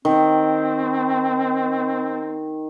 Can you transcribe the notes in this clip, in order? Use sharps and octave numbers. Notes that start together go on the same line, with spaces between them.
D#3 C4